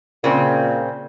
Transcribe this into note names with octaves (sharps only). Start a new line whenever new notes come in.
A#2 C#3 C4